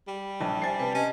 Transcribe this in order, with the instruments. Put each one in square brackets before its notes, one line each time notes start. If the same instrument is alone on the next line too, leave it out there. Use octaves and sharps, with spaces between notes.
[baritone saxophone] G3
[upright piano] A#1 [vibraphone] A5
[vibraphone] C5 E5 G#5 [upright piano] A6 C7
[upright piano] C3 [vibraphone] B4 A5
[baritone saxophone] C#4 [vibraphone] D#5